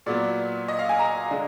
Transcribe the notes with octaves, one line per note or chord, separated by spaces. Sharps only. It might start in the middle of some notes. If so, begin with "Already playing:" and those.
A#2 F#3 B3 D5
D#5
F5
G#5
A#5
D3 G#3 D4